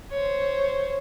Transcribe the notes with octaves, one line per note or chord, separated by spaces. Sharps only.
C5 C#5